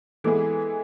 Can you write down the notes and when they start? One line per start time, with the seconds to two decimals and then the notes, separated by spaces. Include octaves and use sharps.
0.24 E3 G#3 B3 E4 G#4 A4